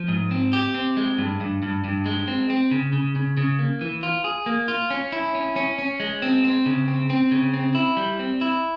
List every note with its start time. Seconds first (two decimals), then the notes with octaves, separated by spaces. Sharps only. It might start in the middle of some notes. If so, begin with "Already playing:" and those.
Already playing: F3
0.08 G#2
0.31 C4
0.53 G4
0.74 C4
0.97 G#3
1.18 G2
1.40 G2
1.63 G2
1.84 G2
2.06 G#3
2.28 C4
2.50 C4
2.71 C#3
2.93 C#3
3.16 C#3
3.37 C#3
3.59 A#3
3.81 E3
4.03 F4
4.24 G#4
4.46 A#3
4.68 F4
4.90 C#4
5.12 E4
5.35 C#4
5.56 C#4
5.79 C#4
6.00 G#3
6.22 C4
6.44 C4
6.66 C#3
6.88 C4
7.10 C4
7.31 C#3
7.54 C4
7.75 E4
7.97 G3
8.19 C4
8.41 E4